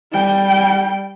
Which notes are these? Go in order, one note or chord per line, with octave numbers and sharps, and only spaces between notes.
G3 G5